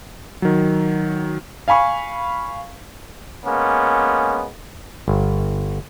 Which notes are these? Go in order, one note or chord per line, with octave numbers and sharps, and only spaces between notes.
D#3 F#3
F5 G#5 B5 C#6
G#3 A#3 B3 C#4
G1